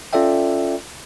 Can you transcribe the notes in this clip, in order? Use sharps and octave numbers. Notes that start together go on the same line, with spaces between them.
C#4 F4 A4 D5 E5 G5